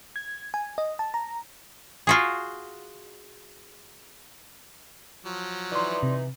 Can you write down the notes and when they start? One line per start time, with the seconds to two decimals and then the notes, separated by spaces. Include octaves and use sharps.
0.16 G#6
0.54 G#5
0.78 D#5
0.99 A5
1.14 A#5
2.07 F4 F#4 G#4
5.25 F3 F#3
5.72 E3 D#4 D5 C6
6.03 C3